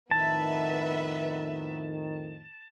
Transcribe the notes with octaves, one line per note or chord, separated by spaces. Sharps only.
F2 A2 D#3 B3 B4 E5 A5